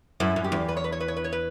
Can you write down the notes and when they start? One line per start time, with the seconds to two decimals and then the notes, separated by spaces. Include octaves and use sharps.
0.20 F#2 E4
0.36 F#2
0.44 G4
0.52 E2
0.68 B4
0.77 C#5
0.84 B4
0.92 C#5
1.00 B4
1.08 C#5
1.17 B4
1.24 C#5
1.33 B4